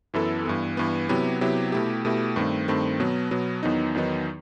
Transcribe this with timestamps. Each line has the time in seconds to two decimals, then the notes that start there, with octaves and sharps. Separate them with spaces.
0.14 F#2 E3 B3 E4 A4
0.45 G2 E3 B3
0.77 G2 E3 B3
1.09 C3 F#3 B3 E4 G4
1.41 C3 F#3 B3 E4 G4
1.72 B2 A3 E4 G4
2.05 B2 A3 E4 G4
2.36 G2 D#3 A3 C4
2.68 G2 D#3 A3 C4
3.00 B2 F#3 B3
3.31 B2 F#3 B3
3.63 E2 D#3 F#3 B3 D#4
3.95 E2 D#3 F#3 B3 D#4